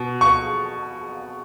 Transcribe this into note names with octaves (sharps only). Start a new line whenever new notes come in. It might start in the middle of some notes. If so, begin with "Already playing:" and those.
Already playing: B2
C#6